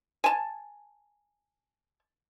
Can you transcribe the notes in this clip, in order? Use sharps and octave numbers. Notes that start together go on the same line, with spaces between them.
G#5 A5